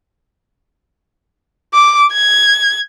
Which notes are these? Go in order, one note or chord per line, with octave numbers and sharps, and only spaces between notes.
D6
G#6